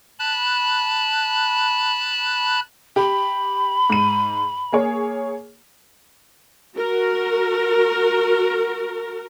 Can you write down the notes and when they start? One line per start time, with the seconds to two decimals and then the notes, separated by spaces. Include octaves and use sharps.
0.19 A5 B5 F#6
2.96 G4 B5
3.90 G#2 D#7
4.72 A#3 G#4 C#5
6.77 F#4 A#4